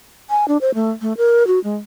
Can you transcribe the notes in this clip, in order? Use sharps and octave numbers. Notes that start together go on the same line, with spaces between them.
G#5
D4
C5
A3
A3
A#4
F#4
G#3